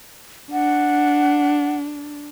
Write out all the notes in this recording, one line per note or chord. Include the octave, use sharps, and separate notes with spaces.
D4 F#5